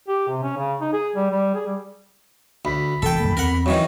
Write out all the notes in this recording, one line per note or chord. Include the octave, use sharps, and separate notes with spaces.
G4
C3
C#4
C#3
D#4
G#4
G3
G3
G#4
G3
D2 B5
E1 A4 G5
F#2 D#3 A#3
E2 C4 A#4 F#5
F#2 D#3 E3 C#5